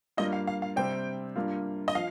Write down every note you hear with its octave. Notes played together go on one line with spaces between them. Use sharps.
G2 G3 A#3 F4 D#5
F5
F5
F5
C3 G3 C4 G5
G2 G3 A#3 F4
D#5
F3 F5